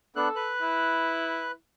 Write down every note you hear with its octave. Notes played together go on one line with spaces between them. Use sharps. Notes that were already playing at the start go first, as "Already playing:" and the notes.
B3 D4 A4 F#6
B4 F#6
E4